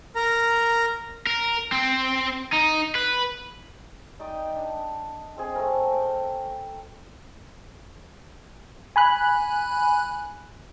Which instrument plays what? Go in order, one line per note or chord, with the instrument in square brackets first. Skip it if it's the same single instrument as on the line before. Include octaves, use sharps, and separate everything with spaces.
[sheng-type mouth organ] A#4 A#5
[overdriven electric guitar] A#4
C4
D#4
B4
[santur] D#4 D5 G5 D#6
D4
G#3 C4 G#4
G#3 A3 C4 A#4
G5
[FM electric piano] G#5 B5 F#6